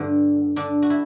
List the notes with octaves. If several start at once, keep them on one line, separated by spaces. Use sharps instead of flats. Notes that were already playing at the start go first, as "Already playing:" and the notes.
Already playing: G2 D3
D3 D4
F#4
E4